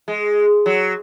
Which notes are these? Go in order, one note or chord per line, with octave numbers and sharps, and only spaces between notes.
G#3
F#3